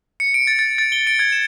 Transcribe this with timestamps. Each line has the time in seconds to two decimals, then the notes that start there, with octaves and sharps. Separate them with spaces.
0.20 C#7
0.34 D7
0.47 A6
0.59 A6
0.78 A6
0.92 G7
1.07 D7
1.19 G#6
1.32 E7